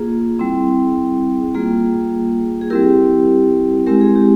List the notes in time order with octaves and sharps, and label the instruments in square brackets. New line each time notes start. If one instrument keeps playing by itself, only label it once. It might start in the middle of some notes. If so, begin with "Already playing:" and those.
Already playing: [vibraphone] A#3 F4 G#4
G3 C4 E4
G3 A#3 F4 G#4
G#4
G3 C4 E4 G4 A#4
G#3 C4 E4 G4 A#4
G#4
G4